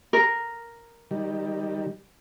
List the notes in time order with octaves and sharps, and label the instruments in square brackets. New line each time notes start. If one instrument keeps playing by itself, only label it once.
[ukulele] A#4
[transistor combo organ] D#3 G3